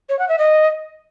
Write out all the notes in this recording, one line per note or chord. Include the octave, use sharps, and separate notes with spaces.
C#5
F#5
E5
D#5